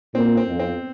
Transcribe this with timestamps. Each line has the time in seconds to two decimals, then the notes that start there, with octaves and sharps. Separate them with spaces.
0.14 A#2 C4
0.37 C4
0.48 F2
0.59 C4